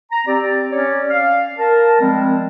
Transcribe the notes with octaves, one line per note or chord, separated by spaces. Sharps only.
A#5
C4 G4 D5
C#4 C#5 D5
F5
A#4 A5
F3 G3 G#3 C4